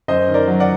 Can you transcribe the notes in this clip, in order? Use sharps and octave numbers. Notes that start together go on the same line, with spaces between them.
F#2 C5 D#5
D#3
A#4 D5
F#3
D5 F#5